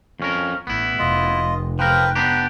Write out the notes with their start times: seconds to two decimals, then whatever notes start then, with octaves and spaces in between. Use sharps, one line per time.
0.20 F2 C#4 A#4
0.67 A1 B3 E4
0.99 F1 F4 D#5
1.79 F3 A#4 B4 G5
2.15 B3 D4 G4 A#5